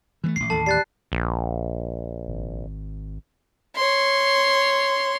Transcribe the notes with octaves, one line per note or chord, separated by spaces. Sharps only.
E3 G#3 A3
A1 G#2 C7
A1 D#2 A4 A5
G3 F#6 A6 C7
A#1
G#1
C#5 C6